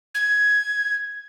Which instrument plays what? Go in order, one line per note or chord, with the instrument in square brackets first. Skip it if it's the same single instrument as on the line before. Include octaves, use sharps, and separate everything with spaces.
[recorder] G#6